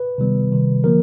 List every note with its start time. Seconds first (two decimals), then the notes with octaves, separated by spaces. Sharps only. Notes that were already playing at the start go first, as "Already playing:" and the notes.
Already playing: B4
0.18 C3 D#3 G3 B3
0.52 C3 D#3 G3
0.84 D3 F3 A#3 A#4